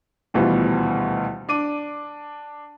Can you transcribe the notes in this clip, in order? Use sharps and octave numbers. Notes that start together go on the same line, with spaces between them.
D#1 D2 B2 E3 G3 F4
D4 D6 D#7